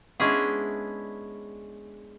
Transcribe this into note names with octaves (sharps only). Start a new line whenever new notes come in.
G#3 B3 C#4 D4 E4 G#4